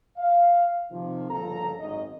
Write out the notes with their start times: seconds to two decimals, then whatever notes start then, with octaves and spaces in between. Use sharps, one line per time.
0.17 F5
0.91 C3 D#3 F3
1.30 G1 A#2 C#3 F3 A4 A#5
1.79 G#1 F#2 D#4 D#5